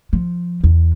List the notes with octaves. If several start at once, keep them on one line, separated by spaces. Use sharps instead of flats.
F3
E2